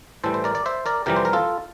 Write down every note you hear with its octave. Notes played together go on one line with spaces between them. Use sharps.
A2 E3 G3 A4 C5
C5
A#4 D5
D5
C5 E5
A#4 D5
F2 C3 E3 G3 G4 A#4
C5
A#4
F4 A4